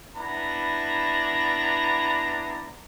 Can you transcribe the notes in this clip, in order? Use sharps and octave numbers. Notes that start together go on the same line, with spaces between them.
B3 D4 E4 A#5 B5